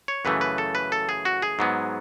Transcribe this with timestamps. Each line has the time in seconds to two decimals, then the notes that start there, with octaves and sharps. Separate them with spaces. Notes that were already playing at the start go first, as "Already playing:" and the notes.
0.08 C#5
0.25 F#2 C#3 E3 A3 B4
0.41 B4
0.58 A4
0.75 B4
0.92 A4
1.09 G#4
1.25 F#4
1.42 G#4
1.59 G#2 F#3 B3